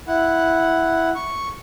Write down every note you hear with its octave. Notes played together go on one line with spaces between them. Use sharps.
E4 F#5
C#6